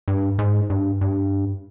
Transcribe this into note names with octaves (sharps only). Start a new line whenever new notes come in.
G2
G#2
G2
G2